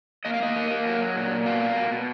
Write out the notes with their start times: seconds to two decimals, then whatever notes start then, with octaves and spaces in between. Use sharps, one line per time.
0.25 A#3 D#5
0.34 F5
0.40 A#3 D#5
0.56 A#3
0.71 A#3
0.86 F#3
1.00 F#3
1.16 A#2
1.31 A#2
1.46 B2 F5
1.61 A#3
1.76 B2
1.92 B2